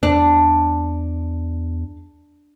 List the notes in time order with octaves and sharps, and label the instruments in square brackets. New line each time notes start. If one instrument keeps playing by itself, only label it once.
[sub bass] E2 [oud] D4